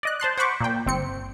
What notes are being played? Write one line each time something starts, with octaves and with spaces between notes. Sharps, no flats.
D5 D#5 F#6
C5 A5 C6 F#6
C5 F#5 B5 C#6 D6
A#2 G5
G1 C4 C#7